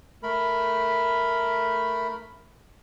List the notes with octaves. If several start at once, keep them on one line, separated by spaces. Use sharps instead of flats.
A3 A#4 B5